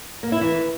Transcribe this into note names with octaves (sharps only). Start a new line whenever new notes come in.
A#3
E4
E3